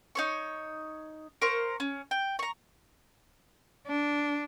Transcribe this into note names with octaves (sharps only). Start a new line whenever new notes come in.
D#4 C#5 C#6
A#4 C5 F5 C#6
C#4
G5
A#5 C#6
D4